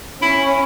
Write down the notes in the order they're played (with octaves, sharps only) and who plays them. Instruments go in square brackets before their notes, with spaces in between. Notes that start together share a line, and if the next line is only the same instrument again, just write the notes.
[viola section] C#4 [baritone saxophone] E4